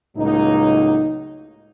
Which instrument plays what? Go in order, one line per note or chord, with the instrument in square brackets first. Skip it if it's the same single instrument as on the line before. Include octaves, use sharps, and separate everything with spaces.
[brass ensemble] C#2 A2 F#3 A#3 D#4